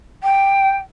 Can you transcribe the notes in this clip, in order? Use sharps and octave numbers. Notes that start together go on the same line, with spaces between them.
G5